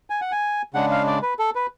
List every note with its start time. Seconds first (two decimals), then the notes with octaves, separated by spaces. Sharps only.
0.10 G#5
0.21 F#5
0.32 G#5
0.74 C#3 G#3 D4 F#5
0.91 F5
1.07 D5
1.23 B4
1.39 A4
1.55 B4